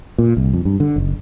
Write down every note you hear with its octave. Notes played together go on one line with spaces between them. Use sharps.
A#2
C2
F2
G2
D3
F#1